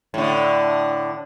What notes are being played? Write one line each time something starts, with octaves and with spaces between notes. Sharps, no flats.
A2 D3